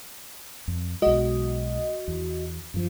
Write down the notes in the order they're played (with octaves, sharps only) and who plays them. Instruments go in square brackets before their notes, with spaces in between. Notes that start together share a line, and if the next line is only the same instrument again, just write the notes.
[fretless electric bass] F2
[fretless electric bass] B1 G#3 [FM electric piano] F#4 D#5
[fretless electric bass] E2
F#2 F3